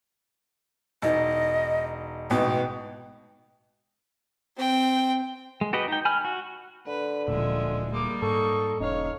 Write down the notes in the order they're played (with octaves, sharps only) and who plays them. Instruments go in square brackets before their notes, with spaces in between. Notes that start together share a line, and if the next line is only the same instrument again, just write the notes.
[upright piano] E1 D#4 [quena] D#5
[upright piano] A1 G#2 B2 [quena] G5
[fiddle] C4 G5
[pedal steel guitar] G#3
F#4 G4 B4 D#5
D#4 G5
G#5 B5 F6
F#4
[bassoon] D3 [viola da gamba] B4
[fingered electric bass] D1 D2 A#2 [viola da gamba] F3 G#3 [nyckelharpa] E5
[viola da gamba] G3 A#3 [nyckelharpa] G#3 D6
[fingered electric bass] G#2 [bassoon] A4 [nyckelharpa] D#5 C#6
[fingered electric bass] E1 C#4 [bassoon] D#4 [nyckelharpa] C#5 F5